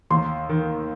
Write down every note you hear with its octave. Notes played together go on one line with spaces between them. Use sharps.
D#2 C6
D#3